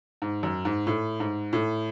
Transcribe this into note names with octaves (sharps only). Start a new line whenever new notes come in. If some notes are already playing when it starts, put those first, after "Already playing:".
G#2
F#2
G#2
A2
G#2
A2